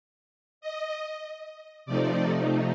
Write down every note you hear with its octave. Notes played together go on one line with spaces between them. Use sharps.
D#5
C3 F3 A3 D#4 D5